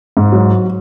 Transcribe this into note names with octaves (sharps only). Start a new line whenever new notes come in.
G#2
F#3